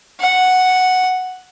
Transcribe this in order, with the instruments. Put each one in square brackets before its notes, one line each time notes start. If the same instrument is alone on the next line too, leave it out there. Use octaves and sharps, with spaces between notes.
[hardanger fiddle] F#5